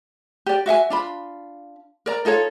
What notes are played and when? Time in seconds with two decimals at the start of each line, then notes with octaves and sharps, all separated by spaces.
0.46 G4 D5
0.66 F#4 E5 F5 G#5
0.90 D4 F4 B5
2.06 A#4 D5 A#5
2.25 D#4 F4 A4 C#5